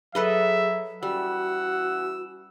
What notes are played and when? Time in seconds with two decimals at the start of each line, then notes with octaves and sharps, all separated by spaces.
0.15 F#3 G#4 A4 B4 D#5 E5
1.03 E3 G3 C#4 F#4 F#5 E6